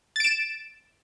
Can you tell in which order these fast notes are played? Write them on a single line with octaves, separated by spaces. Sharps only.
A6 D7 E7